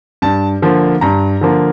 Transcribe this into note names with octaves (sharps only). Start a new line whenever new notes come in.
G2 A5
D3 F3 A#3
G2 A#5
D3 F3 A#3